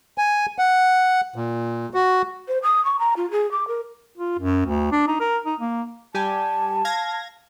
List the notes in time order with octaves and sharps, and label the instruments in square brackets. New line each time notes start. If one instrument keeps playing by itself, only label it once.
[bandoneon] G#5
F#5
A#2
F#4
[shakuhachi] C5
D#6
C#6
A#5
F4
G#4
D6
A#4
[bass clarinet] F4
F#2
D2
D4
D#4
A#4
D#4
A#3
[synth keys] G3 G4 G#5 [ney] A5
[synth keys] F5 G#6 A#6